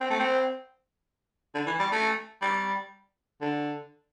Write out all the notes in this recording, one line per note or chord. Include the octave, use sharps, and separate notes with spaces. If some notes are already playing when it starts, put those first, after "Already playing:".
C4
A3
C4
D3
E3
G3
A3
G3
D3